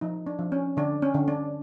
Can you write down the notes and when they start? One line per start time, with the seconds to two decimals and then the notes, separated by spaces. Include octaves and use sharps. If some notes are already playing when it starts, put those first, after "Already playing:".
0.01 F3 D#4
0.27 D4
0.39 F3
0.52 C#4
0.77 D3 D4
1.02 C#4
1.14 D3
1.28 D4